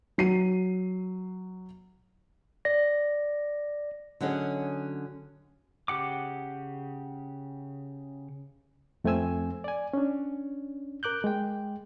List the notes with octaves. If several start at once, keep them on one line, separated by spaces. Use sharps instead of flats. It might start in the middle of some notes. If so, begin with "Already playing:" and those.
F#3 C7 D#7
D5 A#6
D3 F#3 C#4 G#4 D#5
C#3 G4 F#5 D6
F2 A3 C4 G#5 E6
D5 G#5
C#4 D4
A#4 D6 F#6 G6
G#3 G5